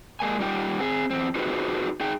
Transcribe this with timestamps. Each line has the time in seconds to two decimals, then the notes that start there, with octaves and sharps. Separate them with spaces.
0.20 G#3 A#3 G#5
0.40 G3 D#4 F4 G4 G5
0.79 C4 G#4
1.10 E2 C4
1.35 D#4 F4 F#4 G#4 B4 C5
2.00 D#4 G#4 G5